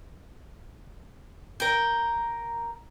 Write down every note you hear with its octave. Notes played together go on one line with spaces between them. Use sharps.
A#4 G5